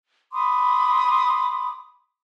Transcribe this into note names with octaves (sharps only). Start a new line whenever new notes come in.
B5 C6 D6 D#6